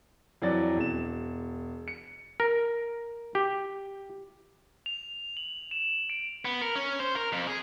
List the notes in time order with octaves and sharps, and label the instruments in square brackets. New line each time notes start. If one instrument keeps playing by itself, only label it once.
[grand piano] F2 E3 F#3 F#4 D5 A6
E1 E7
C#7
[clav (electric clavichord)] A#4
G4
[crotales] F7
F#7
E7
D7
[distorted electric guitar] B3
A#4
C#4
C5
A#4
F2
G#4